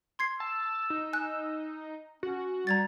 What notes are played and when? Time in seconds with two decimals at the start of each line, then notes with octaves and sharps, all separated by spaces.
0.19 C6 G#6 C7
0.40 A5 E6
0.90 D#4
1.13 G#5 F#6
2.23 C#4 F#4
2.67 G3 A#5 G#6 A6